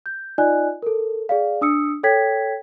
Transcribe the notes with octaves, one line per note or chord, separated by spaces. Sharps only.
G6
D#4 F4 D5 D#5 G#5 F#6
A4 A#4
G#4 D5 F5
D4 D#6 E6 C#7
A4 C#5 G5 G#6 B6